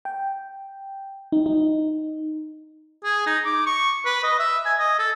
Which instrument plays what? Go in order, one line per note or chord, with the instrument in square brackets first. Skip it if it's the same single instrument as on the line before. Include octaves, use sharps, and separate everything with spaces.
[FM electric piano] G5
D#4
D#4
[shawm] G#4
D#4
D6
C#6
B4
D#5
E5
G#5
D#5
A4